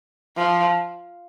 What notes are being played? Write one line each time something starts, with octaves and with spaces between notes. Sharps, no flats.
F3